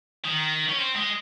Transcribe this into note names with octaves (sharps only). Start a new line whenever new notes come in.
D#3
C#4
C4
G#3